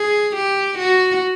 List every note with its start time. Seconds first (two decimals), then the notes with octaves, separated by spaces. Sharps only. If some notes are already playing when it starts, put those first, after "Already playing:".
Already playing: G#4
0.35 G4
0.78 F#4